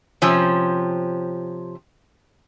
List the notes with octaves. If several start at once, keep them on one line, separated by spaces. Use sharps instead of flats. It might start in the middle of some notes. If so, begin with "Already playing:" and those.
C3 F3 C#4